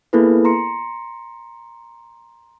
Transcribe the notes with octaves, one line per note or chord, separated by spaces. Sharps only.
A#3 B3 E4 G#4 A4 B4
A#5 C6 C#7